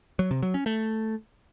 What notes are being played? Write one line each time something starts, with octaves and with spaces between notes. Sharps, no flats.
F#3
C3
F#3
C#4
A3